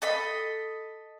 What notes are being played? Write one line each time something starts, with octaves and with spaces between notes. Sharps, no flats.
A4 D#5 B5